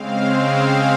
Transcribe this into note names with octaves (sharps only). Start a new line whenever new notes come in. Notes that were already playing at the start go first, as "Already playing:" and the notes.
Already playing: C#3 G#3 C4 F5
F5